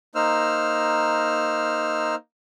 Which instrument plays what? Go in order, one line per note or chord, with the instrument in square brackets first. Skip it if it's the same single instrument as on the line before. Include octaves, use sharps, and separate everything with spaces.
[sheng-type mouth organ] A#3 D#4 C5 E6 F6